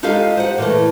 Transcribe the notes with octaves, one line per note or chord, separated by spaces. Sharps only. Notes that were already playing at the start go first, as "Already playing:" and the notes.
G#3 D#4 F4 G4 A4 F5
C5 F#5
A#2 E3 A3